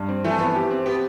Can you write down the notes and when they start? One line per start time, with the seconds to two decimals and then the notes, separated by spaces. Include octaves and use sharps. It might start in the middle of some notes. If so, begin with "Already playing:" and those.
Already playing: G2
0.08 C4
0.24 E3 A3
0.40 B3
0.55 G4
0.71 C4
0.86 B3 G4